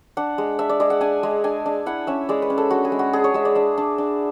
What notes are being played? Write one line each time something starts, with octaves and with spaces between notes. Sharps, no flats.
D4 F#5
G#3
D4 E5
D5
G#3 D5
F#5
D4 G#5
G#3
D4 G#5
D4
E4 F#5
C#4 E5
G#3 D5
B4
C#4
A4
D4 F#4
G#4
G#3
F#4
D4 G#4
C#5
G#3 E5
D5
D4 E5
D4
D4